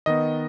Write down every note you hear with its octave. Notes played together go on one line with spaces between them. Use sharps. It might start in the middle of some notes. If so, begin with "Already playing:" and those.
D#3 B3 D#5